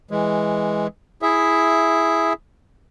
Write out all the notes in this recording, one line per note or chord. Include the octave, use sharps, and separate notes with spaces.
E3 G#3
E4 G#4 E5